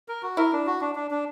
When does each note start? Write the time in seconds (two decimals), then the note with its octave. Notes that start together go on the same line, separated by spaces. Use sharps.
0.08 A#4
0.23 F#4
0.37 E4 A#4
0.53 D4
0.67 F#4
0.81 D4
0.95 D4
1.11 D4